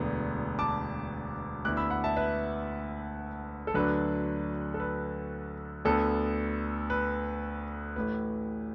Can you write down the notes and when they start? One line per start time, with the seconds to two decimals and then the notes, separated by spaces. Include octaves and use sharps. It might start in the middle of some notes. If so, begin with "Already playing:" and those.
Already playing: E1 D2 D3 B3
0.59 A5 D6
1.65 D2 D3 B3 E4 D6 F#6
1.77 B5 E6
1.90 F#5 B5
2.04 E5 A5
2.16 B4 E5
3.67 A4
3.74 D2 D3 F#3 D4 B4
4.74 A4
4.80 B4
5.85 D2 D3 B3 A4
6.90 B4
7.96 A1 A2 A3 B4